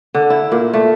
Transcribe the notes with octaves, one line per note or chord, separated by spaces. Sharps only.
D3
E4
A#2
A3